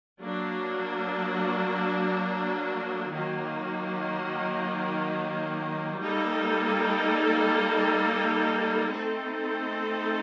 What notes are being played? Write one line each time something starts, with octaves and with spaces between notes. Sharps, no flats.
F#3 A#3 D4
D#3 F#3 A#3
G3 A#3 D#4 A4
A3 C4 D#4 A4